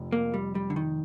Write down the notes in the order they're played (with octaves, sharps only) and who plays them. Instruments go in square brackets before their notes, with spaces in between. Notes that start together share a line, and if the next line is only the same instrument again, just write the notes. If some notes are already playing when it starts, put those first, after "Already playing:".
Already playing: [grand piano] F1 F2
[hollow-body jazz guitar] A#3
G3
G3
D3
D#3